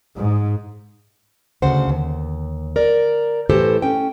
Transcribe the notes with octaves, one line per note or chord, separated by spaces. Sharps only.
G#2
D2 C#3 C5 F#5
D#2
A#4 D5
A2 E3 G4 A4 C5
C#4 G5